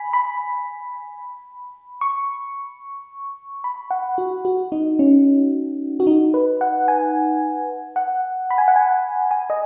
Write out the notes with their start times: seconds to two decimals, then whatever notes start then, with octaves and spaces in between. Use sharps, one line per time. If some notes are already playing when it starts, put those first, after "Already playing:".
Already playing: G#5 B5
0.13 B5
2.01 C#6
3.64 B5
3.91 F#5
4.18 F#4
4.45 F#4
4.72 D#4
4.99 C#4
6.00 F#4
6.07 D#4
6.34 B4
6.61 F#5
6.88 G#5
7.96 F#5
8.51 B5
8.58 G#5
8.68 F#5
8.76 G#5
9.31 G#5
9.50 D#5